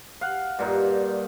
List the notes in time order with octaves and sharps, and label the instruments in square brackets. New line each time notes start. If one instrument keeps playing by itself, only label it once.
[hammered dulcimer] F5 F#5
G2 A#2 D#4